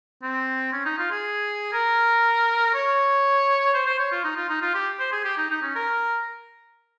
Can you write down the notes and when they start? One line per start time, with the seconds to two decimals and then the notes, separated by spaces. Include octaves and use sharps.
0.23 C4
0.73 C#4
0.85 D#4
0.98 F4
1.11 G#4
1.73 A#4
2.74 C#5
3.74 C5
3.87 C5
3.99 C#5
4.12 F4
4.24 D#4
4.36 F4
4.49 D#4
4.62 F4
4.75 G4
5.00 C5
5.12 G#4
5.25 G4
5.38 D#4
5.50 D#4
5.62 C#4
5.75 A#4